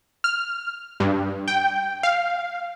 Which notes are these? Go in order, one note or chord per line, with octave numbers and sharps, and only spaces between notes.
F6
G2
G5
F5